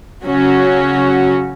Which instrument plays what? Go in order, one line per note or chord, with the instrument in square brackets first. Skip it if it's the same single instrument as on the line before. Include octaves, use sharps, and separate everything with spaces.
[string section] C#3 F#3 C#4 F#4